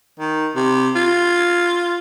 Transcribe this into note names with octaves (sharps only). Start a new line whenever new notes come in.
D#3
C3
F4